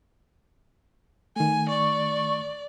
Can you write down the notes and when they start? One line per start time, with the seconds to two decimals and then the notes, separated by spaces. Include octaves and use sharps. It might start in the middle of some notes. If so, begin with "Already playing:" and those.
1.36 D#3 A3 G#5
1.69 D5 C#6